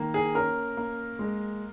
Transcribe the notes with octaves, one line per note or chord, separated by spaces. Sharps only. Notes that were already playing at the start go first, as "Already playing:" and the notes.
Already playing: D#3 A#3
G#4
C#4 A#4
A#3
G#3